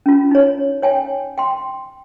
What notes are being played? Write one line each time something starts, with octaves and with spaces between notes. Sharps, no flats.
C#4 F4
D#4 C#5
C#5 G5 G#5
G5 C6